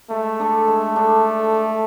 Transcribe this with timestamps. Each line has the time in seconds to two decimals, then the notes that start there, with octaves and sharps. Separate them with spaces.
0.10 G#3 A3
0.39 D4 A4
0.68 G#3
0.96 D4 A4